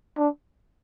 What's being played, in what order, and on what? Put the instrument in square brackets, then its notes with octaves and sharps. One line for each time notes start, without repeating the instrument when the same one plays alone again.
[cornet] D4